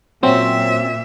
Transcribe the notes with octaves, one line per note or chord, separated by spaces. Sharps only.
A#2 F#3 C4 C#4 E5